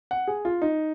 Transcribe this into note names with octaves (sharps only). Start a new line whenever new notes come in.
F#5
G#4
F4
D#4